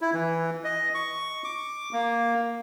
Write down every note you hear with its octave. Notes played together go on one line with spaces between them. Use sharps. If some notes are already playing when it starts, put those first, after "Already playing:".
E4
E3
D#5
C#6
D6
A#3